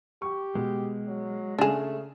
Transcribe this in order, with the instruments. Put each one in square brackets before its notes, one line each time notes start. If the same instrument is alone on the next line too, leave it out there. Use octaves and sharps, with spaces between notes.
[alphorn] G4 [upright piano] C#6
[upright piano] B2 [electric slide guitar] G#3
[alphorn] F#3
[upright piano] C#3 E7 [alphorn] A3 [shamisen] D4 G#4